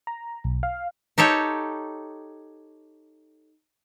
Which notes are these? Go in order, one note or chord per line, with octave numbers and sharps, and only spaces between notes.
A#5
B1
F5
D#4 G4 A4 C#5